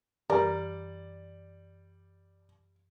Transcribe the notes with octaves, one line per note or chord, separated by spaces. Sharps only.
F#2 E3 G3 A#4 D5